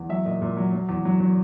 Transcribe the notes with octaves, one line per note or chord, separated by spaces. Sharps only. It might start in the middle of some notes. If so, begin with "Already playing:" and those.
Already playing: E2
F#3 E5
A#2 D#5
A#2
F#3
F#3
E2
F#3
F#3